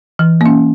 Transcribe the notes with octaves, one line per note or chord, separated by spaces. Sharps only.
E3
A#3 C#4